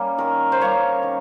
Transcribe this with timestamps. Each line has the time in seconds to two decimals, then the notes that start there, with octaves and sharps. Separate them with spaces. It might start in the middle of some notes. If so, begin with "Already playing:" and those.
Already playing: G3 A#3 C#4
0.18 D#3 A#4
0.52 C5
0.61 G3 A#3 C#4 C#5
1.03 D#3